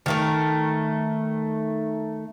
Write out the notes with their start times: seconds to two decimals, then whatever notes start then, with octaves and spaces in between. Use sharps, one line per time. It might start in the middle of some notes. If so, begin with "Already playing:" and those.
0.06 D#3 A3 A#4